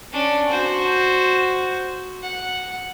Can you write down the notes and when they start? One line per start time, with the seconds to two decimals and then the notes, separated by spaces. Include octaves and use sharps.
0.13 C#4 D4
0.48 F#4 C5
2.23 F#5